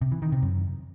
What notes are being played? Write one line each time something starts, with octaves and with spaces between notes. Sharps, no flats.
C3
E3
D#3
C3
F#2